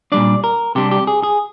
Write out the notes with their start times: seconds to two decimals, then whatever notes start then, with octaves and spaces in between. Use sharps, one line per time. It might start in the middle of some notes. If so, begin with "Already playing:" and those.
0.12 A#2 G3 D4 D5
0.44 A#4
0.75 C3 G3 D4 G4
0.91 G4
1.07 G#4
1.23 G#4